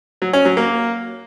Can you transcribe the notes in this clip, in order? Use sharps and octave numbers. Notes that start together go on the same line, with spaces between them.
F#3
C#4
F#3
A#3